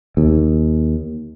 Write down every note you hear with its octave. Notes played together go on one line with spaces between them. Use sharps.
D#2